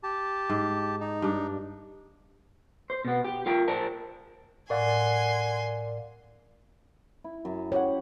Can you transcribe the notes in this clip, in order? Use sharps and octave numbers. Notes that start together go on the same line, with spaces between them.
G4 A5
G#2
D#4
G2 D4
C5
B2 B3
G4
F4 A#4 G5
A#4 C5 D5 A5
A2 A#4 D5 F5 F#5 G#5 C6
E4
F#2
G4 C#5 F#5